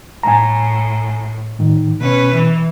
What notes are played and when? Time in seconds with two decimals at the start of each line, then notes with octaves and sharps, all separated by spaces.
0.23 A2 G#5 A#5
1.59 A2 D#3
2.01 B2 C#4 B4
2.33 E3